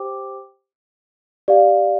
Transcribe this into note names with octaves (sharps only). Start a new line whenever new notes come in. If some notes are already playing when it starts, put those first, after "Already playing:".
Already playing: G4 C5 G5 D6
G4 D5 F5